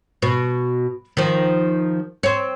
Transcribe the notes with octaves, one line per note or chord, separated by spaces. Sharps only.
B2
D#3 F3
C4 C#5